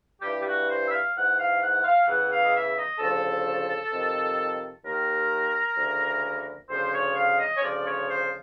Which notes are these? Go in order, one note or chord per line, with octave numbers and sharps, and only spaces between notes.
G2 E3 G4
G4
F#4
C5
E5
F5
G#2 E3 F#5
F5
F#5
F5
E2 C#3 E3 F#5
F5
D#5
E5
D#5
D2 C#3 F3 A4
F2 C3 D#3
D#2 D#3 A#4
D2 C#3 E3
D2 C#3 F3 C5
C#5
F5
D#5
C#5
D2 C#3 F3 D5
C#5
C5